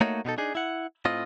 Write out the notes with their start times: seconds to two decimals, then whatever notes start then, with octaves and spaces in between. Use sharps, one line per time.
0.01 A3 A#3 D#4 F#4 C#5 D#5
0.25 B2 B3 D#4 A4
0.38 D4 D#4 G#4
0.55 E4 F#5
1.05 A2 C4 F4 D#5